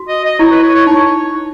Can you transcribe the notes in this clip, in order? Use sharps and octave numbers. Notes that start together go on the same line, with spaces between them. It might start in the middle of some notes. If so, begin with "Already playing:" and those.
Already playing: F#4
D#5
D#5
E4 C#5
B4
C#5
C#5
D#4 C#5